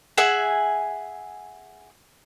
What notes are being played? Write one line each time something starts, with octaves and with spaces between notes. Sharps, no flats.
G#4 E5 F#5 G#5